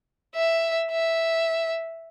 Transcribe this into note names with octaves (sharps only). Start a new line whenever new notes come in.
E5
E5